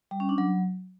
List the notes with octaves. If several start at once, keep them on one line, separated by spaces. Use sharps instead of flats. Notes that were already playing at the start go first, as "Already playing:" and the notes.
G3
C#4
D4
F#3